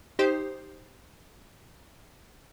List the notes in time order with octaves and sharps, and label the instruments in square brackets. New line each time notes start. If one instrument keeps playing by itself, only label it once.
[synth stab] D#4 G4 C5